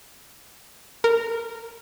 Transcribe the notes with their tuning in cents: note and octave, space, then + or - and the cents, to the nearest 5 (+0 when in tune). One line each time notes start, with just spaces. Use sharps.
A#4 -15